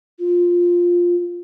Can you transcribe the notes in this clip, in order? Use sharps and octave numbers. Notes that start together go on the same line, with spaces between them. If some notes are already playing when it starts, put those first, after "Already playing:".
F4